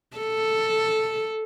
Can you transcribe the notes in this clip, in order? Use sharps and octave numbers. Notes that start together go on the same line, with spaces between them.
A4